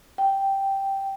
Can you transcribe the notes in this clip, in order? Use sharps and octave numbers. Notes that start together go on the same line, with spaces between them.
G5